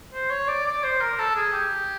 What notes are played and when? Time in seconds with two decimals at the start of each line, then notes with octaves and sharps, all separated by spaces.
0.14 C5
0.31 C#5
0.48 D5
0.66 D5
0.84 C5
1.00 A#4
1.19 A4
1.35 G#4
1.53 G4